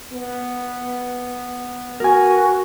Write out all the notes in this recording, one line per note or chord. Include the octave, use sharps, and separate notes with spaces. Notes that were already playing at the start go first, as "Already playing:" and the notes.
B3
F#4 A#4 G#5